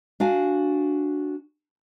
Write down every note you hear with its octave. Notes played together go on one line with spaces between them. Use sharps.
D4 F#4 F5 G#5